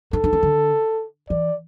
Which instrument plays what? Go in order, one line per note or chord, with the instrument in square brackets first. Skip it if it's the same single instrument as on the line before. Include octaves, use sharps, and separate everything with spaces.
[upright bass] D4 [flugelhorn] A4
[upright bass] D4
C#4
D3
[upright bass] E3 [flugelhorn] D5